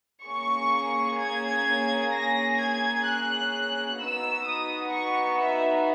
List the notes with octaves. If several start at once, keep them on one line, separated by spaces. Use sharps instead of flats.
A#3 C#4 G#4 C#6
G#6
A#6
G#6
F#6
B3 D#4 F#4 E6
D#6
C#6
E5